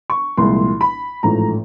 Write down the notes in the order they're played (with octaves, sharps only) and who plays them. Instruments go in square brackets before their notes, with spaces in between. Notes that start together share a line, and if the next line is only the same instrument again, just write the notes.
[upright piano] C#6
C2 A#2 F3 G#3 C6
B5
A1 G#2 F3 A3 A#5